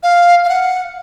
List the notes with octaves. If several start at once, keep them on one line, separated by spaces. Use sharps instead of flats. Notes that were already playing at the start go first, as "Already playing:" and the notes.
F5
F5
F#5